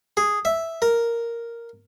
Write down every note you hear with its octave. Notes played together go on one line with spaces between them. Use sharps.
G#4
E5
A#4